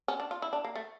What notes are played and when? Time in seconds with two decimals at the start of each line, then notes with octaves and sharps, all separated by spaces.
0.08 C#4
0.20 D4
0.31 F4
0.42 E4
0.53 D4
0.64 A#3
0.75 A3